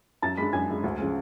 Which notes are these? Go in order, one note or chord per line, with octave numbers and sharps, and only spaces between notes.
F#2 A5 A6
D3 G#3 B5 B6
F#2 G#5 G#6
D3 G#3
D2
C#3 F3 G#3